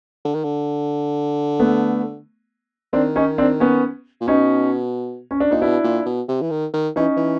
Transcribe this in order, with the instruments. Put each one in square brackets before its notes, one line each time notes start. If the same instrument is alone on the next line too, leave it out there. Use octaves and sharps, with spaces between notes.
[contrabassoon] D3
D#3
D3
[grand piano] A3 B3
[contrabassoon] D#3 [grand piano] C4 D4
[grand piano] C#4 D#4
C4 D4
B3 C#4
[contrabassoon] A#2
[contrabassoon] B2 [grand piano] C#4 D#4
[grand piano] C#4
D4
[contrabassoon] A#2 [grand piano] D#4
[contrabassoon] B2 [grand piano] D4 E4
[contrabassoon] A#2
B2
C3
E3
D#3
D#3
[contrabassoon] E3 [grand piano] C#4 D#4
[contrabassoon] E3